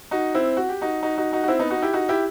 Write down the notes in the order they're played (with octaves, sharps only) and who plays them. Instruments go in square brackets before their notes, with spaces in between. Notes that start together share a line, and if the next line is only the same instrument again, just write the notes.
[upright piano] D#4 F#4
C4 E4
F#4
G4
D#4 F#4
D#4 F#4
D#4 F#4
D#4 F#4
F#4
C4 E4
B3 D#4
D#4 F#4
E4 G4
D#4 F#4
E4 G4